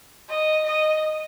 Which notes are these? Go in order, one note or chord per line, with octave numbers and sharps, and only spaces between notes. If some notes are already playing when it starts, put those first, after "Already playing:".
D#5
D#5